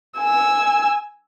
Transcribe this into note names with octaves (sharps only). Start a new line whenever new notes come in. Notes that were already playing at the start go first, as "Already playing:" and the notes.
G#5 E6